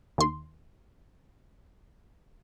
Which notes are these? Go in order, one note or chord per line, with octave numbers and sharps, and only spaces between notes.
D#2 C6